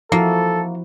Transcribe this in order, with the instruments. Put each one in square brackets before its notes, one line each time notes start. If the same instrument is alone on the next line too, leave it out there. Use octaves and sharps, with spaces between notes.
[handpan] F3 E4 F#4 [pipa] A#3 [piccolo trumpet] A4